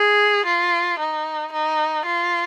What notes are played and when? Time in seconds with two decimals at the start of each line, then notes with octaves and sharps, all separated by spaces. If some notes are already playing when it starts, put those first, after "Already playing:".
Already playing: G#4
0.46 F4
0.99 D#4
1.53 D#4
2.06 F4